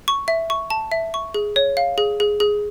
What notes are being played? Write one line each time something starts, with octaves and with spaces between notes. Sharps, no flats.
C#6
E5
C#6
A5
E5
C#6
G#4
C#5
F5
G#4
G#4
G#4